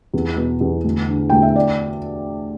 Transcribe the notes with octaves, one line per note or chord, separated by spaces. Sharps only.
E2
B2
E2
D2
D3
D2 G5
E5
D5